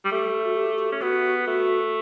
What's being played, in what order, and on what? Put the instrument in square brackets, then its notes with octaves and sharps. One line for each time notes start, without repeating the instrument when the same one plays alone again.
[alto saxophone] G3
[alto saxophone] A3 [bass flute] G4
[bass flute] F#4
G4
G4
[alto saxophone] C#4
[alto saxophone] B3 [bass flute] F#4
[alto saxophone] A3 [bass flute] F#4